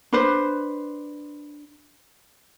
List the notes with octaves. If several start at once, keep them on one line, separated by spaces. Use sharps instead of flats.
D4 B4 C5